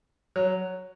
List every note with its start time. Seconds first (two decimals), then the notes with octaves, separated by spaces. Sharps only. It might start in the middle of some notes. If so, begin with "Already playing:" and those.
0.36 F#3